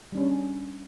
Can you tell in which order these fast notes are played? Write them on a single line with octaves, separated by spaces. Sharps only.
G3 D4 C#4